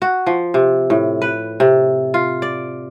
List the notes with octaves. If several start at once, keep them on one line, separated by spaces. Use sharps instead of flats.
F#4
F3
C3
A2
B4
C3
F4
D5